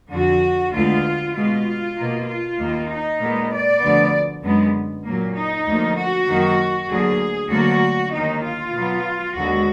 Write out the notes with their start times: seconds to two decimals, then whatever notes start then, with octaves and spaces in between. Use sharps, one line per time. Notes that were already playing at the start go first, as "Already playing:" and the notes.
0.12 F2 D3 F3 F#4
0.74 D2 D3 G#3 B3 F4
1.35 B2 G#3 B3 F4
1.97 B2 A#3
2.28 F4
2.59 D#2 D#3 A#3
2.89 D#4
3.20 A#2 G#3 B3
3.51 D5
3.82 D2 D3 F3 B3
4.44 F#2 D3 G#3 B3
5.06 A#2 F#3 A#3
5.36 D#4
5.67 D2 D3 F3 A#3
5.98 F#4
6.28 F#2 D#3 F#3 A#3
6.90 D2 D3 F#3 A#3 G#4
7.52 D2 D3 F#3 A#3 F#4
8.13 D#2 D#3 A#3 D#4
8.44 F4
8.76 B2 F#3 B3
9.37 D#2 D3 G#3 B3 F#4